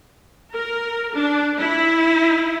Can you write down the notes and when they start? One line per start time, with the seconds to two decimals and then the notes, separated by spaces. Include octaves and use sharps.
0.55 A#4
1.16 D4
1.59 E4